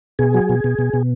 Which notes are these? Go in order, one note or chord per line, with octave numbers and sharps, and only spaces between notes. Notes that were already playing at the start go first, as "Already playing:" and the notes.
B2 G#4
F#3
B2
B2
B2
B2